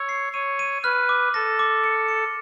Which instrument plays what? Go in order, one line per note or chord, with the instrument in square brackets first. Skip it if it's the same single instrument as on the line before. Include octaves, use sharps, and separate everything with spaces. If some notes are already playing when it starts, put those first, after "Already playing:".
Already playing: [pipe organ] C#5 [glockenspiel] E6
[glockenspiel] C7
[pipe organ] C#5 [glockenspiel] D#7
[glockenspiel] D#7
[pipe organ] B4 [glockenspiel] F6
[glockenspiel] D6
[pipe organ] A4 [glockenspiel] A#6
[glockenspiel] D6
C#7
C#7